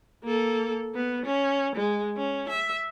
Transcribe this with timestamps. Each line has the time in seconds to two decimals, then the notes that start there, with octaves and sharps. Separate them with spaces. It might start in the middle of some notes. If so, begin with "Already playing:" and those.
0.24 A#3 A4
0.95 B3
1.26 C#4
1.76 G#3
2.17 C#4
2.49 E5